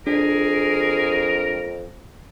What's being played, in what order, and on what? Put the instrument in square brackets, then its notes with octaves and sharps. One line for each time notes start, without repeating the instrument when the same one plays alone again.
[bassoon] F2 [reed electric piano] D4 [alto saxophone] G#4 [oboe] A#4